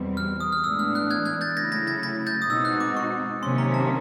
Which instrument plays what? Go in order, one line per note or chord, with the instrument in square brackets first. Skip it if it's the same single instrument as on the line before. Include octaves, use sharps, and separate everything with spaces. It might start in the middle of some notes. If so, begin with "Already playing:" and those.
Already playing: [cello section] E2 B2 G3 C4
[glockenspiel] F6
D#6
F6
[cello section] A2 E3 G#3 B3 D4 [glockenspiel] E6
[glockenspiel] F6
F#6
F#6 G#6
F#6 G#6
G6 A6
[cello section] C#3 F#3 A3 C#4 E4 [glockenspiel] G#6 A#6
[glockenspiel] G#6 A#6
G#6 A#6
G#6 A#6
G6 A6
D#6
[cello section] B2 G#3 C4 D#4 F#4 [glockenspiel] E6
[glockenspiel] F#6
D6
C#6
[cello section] C3 D#3 F#3 A#3 C#4 [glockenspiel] C6
[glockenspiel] A#5
A5